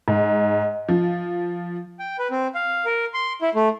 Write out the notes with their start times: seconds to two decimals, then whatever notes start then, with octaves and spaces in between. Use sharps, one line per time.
0.08 G#2
0.89 F3
1.99 G5
2.19 B4
2.31 C4
2.55 F5
2.85 A#4
3.14 C6
3.42 E4
3.55 A3